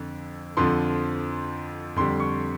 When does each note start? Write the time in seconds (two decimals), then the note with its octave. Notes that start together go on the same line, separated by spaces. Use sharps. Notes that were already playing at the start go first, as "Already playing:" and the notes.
Already playing: F2 D3
0.57 F2 D3 F3 C6
1.96 F2 D3 G3 C6
2.20 C#6